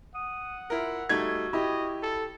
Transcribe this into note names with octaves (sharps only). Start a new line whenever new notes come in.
F#5 D#6
E4 F4 A#4
G3 A3 D#4 F#4 G#6
E4 G4 D#5
A4